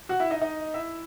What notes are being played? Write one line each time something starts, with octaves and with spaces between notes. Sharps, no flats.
F#4 F#5
E4 E5
D#4 D#5
D#4 D#5
E4 E5